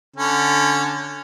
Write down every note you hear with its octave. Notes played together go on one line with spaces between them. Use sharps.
D3 C#4